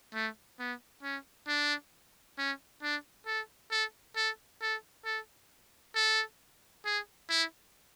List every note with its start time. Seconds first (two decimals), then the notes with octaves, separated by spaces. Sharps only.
0.14 A3
0.59 B3
1.03 C#4
1.48 D4
2.38 C#4
2.82 D4
3.26 A4
3.71 A4
4.16 A4
4.62 A4
5.05 A4
5.95 A4
6.85 G#4
7.30 E4